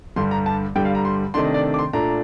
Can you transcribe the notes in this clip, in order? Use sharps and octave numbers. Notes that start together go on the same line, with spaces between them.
G2 D3 G3 C6
A#5
A5
G2 D3 G3 G5
F5
A#5
C6
C3 D#3 A3 D4 C6
D#5
D5
D6
C6
A#2 A3 D4 A#5